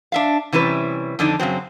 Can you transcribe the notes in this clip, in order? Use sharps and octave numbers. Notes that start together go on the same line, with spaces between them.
D4 E5 F5
C3 E3 G3 C#4 B4
F2 D3 D4 D#4
F#2 C#3 F#3 C4